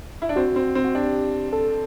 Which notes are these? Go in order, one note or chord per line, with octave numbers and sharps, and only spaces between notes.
E4
D4
C4 F#4
C4
C4
F#4
D4 G4
A4